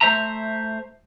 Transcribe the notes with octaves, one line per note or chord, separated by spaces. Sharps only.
A3 C5 E5 A#5